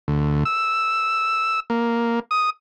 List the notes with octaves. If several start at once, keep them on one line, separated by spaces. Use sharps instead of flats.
D2
E6
A#3
D#6